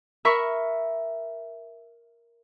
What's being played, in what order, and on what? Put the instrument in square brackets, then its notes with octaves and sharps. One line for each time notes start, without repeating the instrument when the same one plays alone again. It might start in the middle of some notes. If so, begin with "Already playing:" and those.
[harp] A#4 E5 B5 C#6